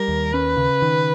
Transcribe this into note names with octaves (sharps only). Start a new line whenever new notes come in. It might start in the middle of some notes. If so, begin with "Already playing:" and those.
Already playing: G3 A#4
D#2
C#4 B4
C#3
D#3